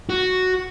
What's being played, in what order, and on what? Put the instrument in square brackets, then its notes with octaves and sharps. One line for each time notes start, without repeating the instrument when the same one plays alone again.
[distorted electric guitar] F#4